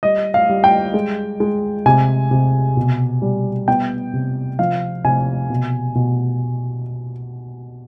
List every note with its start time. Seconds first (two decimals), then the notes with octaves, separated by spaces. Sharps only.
0.03 G3 D#5
0.34 F5
0.49 G3
0.64 G5
0.94 G#3
1.40 G#3
1.86 C3 G#5
2.31 C3
2.77 B2
3.22 G3
3.68 B3 G5
4.13 C3
4.59 F3 F5
5.04 C3 G#5
5.50 B2
5.95 B2